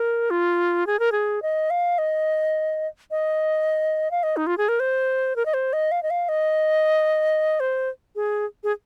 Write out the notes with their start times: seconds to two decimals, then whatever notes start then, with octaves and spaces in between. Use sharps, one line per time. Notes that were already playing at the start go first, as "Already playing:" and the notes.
Already playing: A#4
0.30 F4
0.87 G#4
1.00 A#4
1.12 G#4
1.42 D#5
1.70 F5
1.98 D#5
3.11 D#5
4.11 F5
4.23 D#5
4.37 D#4
4.47 F4
4.58 G#4
4.68 A#4
4.80 C5
5.36 A#4
5.46 D#5
5.54 C5
5.73 D#5
5.92 F5
6.03 D#5
6.10 F5
6.29 D#5
7.60 C5
8.16 G#4
8.64 G#4